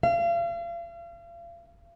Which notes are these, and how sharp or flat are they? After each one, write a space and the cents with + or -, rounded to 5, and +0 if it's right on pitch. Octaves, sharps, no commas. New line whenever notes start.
F5 -40